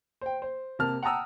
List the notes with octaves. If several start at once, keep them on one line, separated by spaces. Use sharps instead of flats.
C5 G5
C5
C3 A#3 A5 F6
F#5 G5 A5 A#5 D#6 E6